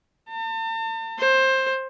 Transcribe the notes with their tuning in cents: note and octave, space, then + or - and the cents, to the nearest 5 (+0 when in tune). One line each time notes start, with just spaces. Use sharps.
A5 +40
C5 +15